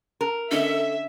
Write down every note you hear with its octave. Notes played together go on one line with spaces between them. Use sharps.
A#4
D3 C#4 A4 D#5 E5